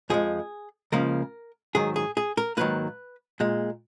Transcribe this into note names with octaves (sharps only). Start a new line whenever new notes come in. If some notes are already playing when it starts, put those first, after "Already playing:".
F2 F3 G#3 G#4
C#2 C#3 F3 A#3 A#4
G#2 D#3 F#3 G#4
G#4
G#4
A#4
G#2 D#3 F#3 A#3 B4
A#2 G#3